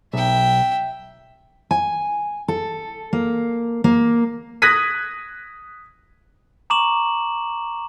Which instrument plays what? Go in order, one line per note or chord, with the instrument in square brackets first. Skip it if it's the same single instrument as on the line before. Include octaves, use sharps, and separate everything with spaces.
[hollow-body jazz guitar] B1 [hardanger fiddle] E5 G5
[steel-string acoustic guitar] G#5
A4
A#3
A#3
[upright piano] D#6 F#6 G#6 A#6 B6 D#7
[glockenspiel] A#5 C#6 D6 E7 F#7